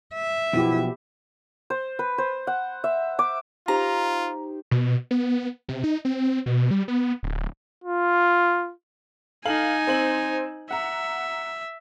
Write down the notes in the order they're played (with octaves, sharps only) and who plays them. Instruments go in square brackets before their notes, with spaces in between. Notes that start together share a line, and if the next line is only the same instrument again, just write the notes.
[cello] E5
[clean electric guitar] B1 B2 F3 [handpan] B3 G4 [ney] E4
[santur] C5
B4
C5
F#5
E5
D6
[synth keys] D#4 G4 C5 [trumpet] F4 [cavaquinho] A#5
[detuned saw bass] B2
B3
C3
D#4
C4
B2
G3
B3
D1
[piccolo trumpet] F4
[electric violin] D#4 G#5 [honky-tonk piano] A4 F5 F#7
[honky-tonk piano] C4 C5 F#7
[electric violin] E5 [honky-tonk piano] F#5 A#5